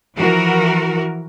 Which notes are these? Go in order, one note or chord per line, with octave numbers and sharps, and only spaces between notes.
E3 F3 F#4 A#4